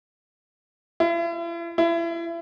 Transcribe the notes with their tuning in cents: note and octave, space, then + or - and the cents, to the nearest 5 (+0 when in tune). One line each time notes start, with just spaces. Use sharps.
E4 +45
E4 +35